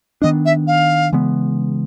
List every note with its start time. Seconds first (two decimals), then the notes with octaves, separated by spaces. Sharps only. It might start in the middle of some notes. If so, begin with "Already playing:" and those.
0.22 D#3 F#3 B3 D4 D#5
0.45 E5
0.67 F5
1.13 C#3 E3 G#3 B3